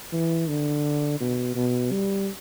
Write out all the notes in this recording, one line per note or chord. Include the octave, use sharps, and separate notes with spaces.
E3
D3
B2
B2
G3